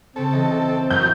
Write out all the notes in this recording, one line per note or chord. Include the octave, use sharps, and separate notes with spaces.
C#3 C4 A4 C#5
B1 E3 D#5
F#2 G6